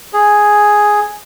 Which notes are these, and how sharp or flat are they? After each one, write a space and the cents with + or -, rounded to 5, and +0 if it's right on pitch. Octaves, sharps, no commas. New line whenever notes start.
G#4 +0